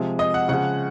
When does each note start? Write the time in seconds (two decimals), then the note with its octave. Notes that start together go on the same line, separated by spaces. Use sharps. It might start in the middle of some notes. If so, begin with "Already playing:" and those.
Already playing: C3 F3 G#3
0.19 D#5
0.34 F#5
0.49 C#3 F3 G#3 F#5